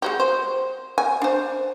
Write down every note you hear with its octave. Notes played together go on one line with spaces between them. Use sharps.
G#3 F#4 G4
C5
G#5
D4 C5